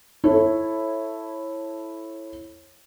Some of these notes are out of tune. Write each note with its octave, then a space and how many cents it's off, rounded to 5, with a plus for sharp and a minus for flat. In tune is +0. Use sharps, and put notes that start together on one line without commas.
E4 +0 A4 +0 C#5 -25